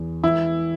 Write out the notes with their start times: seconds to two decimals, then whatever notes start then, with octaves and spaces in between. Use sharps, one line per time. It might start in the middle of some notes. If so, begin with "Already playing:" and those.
Already playing: E2
0.24 E3 E4